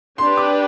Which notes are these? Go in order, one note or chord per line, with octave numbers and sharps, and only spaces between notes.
D4 G4 B4 C6
D6